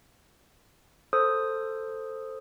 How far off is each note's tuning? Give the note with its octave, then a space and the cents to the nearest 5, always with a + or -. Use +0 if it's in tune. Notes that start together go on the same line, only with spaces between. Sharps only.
A4 +10 C5 +5 D#6 +0